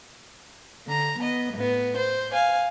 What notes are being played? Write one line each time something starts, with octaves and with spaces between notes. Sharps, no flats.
D3 A#5
B3 D#5
A2 B3
C5
F5 G#5